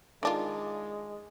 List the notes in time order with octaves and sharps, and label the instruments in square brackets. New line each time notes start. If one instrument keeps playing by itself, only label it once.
[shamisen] D#3 D4 F4 [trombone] G#3